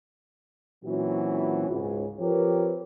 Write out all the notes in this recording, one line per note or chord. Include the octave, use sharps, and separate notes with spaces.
A#2 E3 F#3 C4 C#4 F#4
C#2 G#2 C#3
F3 C4 G4 A#4 B4 C#5